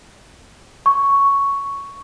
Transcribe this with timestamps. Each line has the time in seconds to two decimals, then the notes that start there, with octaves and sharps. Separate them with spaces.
0.86 C#6